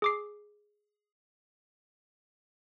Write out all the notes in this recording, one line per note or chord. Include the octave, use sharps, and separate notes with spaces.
G#4 D6 C7